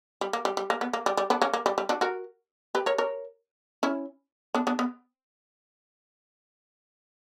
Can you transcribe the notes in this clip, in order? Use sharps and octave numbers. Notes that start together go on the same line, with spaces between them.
G3
A#3
G3
G3
A#3
B3
A#3
G3
G3
B3 D4
A#3 C#4
A#3
G3
G3
D4 F#4
F#4 A#4
G4 B4
A#4 C#5
A#4 C#5
C#4 E4
B3 D4
B3 D4
B3